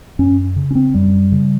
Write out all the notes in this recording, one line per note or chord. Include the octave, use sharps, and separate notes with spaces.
F#2 C#4
C#3
C#4
C4
F#2 G3
C#3